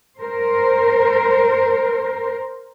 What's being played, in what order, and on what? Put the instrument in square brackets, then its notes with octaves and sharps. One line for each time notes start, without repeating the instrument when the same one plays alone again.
[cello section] A#4 C5